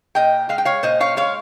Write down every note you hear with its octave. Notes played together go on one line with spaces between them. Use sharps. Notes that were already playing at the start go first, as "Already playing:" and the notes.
A#2 D#5 G5
G#3 F5
G5
C#5 F5
A#2 C5 D#5
C#5 F5
G#3 C#5 F5